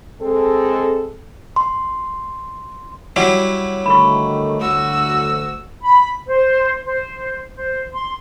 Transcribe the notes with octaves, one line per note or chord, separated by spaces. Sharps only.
G#3 C4 A4
C6
F#3 G3 E4 F#5 G5
D3 D#3 A3 B5 C#6
D2 F#4 E6
B5
C5
C5
C5
C6